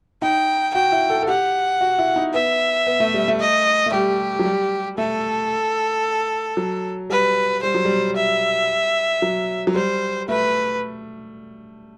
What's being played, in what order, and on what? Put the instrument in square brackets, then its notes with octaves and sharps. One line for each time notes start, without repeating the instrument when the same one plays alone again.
[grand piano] D#4 [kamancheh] G5
[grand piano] F#4 [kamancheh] G5
[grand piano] E4
A4
A4
[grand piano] G4 [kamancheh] F#5
[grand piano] F#4
E4
D#4
[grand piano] B3 [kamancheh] E5
[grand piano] B3
A3
G3
A3
[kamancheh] D#5
[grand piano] A3
[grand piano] G3 [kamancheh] G4
[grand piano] F#3
G3
[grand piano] A3 [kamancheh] A4
[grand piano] F#3
[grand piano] G3 [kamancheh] B4
[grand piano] G3 [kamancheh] C5
[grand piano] F#3
G3
[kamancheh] E5
[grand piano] F#3
F#3
[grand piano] G3 [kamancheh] C5
[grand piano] A3 [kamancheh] B4